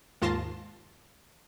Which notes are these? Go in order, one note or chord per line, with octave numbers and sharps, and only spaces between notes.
D#2 G#2 F4 A5 C6 A#6